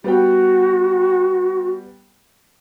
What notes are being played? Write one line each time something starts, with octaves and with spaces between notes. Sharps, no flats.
G3 B3 F#4 G5